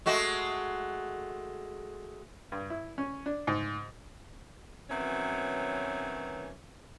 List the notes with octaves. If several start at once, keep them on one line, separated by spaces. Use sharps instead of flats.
G#3 A3 F#4
G2
E4
C#4
D4
G#2
B2 D#3 E3 F#3 C4 C#4